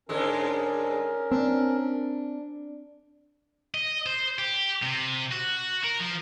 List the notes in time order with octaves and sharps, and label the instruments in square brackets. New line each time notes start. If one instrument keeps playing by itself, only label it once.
[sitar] G#2 D3 G#3 [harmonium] C#4 A#4
[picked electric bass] C4 [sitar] D4
[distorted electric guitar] D#5
C5
G4
C3
F#4
A#4
F3